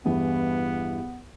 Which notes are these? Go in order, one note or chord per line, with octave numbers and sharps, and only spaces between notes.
E2 G2 E3 B3